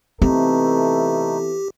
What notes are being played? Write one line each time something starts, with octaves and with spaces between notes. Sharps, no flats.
C3 E3 A3 B3 C4 D#4 G4 A4